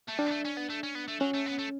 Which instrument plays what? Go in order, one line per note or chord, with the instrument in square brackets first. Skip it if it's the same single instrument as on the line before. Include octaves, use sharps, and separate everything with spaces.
[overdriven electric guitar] A3
[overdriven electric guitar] G3 [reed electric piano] D4
[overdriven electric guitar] B3
A3
C#4
B3
A3
C#4
B3
A3
[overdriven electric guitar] F#3 [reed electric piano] C#4
[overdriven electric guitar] A3
B3
A3